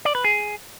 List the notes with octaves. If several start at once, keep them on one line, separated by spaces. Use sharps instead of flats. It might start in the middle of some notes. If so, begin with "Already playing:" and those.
D5
B4
G#4